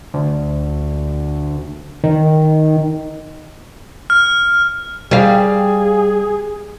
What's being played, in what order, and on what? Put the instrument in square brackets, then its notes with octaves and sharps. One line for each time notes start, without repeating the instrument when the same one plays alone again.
[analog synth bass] D2
D#3
[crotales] F6
[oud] G3 F5 [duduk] G#4